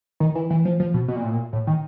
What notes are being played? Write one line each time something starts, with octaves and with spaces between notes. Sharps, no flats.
D#3
E3
E3
F3
F3
B2
B2
A#2
A2
A#2
A2
D#3